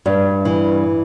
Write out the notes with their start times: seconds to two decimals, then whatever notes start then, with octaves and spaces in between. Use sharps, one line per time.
0.06 G2
0.45 E3